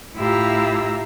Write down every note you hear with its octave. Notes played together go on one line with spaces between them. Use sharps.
A2 E4 F4 G4 A#5 E6